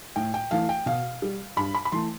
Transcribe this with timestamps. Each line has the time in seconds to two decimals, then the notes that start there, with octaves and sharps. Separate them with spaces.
0.16 A2 G5
0.34 G5
0.51 E3 A3 F5
0.69 G5
0.86 B2 F5
1.22 G3
1.57 G2 B5
1.75 B5
1.85 B5
1.92 E3 A3 C6